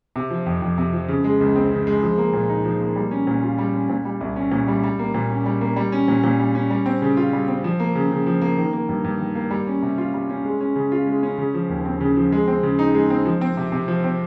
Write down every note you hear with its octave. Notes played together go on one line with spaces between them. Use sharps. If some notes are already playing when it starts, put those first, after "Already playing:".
C3
F3
F2
F2
C3
F3
C#3
G#3
C#2
C4
C#3
G#3
F3
A#3
A#2
D#4
F3
A#3
G3
C#4
A#2
F4
G3
C#4
A#2
G3
C2
C#4
A#2
G3
G3
A#3
A#2
C#4
G3
A#3
G3
C#4
A#2
A#2
G3
C#4
G3
C4
C#3
F4
G3
C4
F3
A#3
C#3
C#3
F3
A#3
D#3
A#3
G2
G2
D#3
A#3
G3
C#4
C3
F4
G3
C#4
G#3
C#4
C#3
F4
G#3
C#4
C#3
F3
D#2
C4
C#3
F3
G#3
C4
C#3
D#4
G#3
C4
F3
C4
C3
C3
F3
C4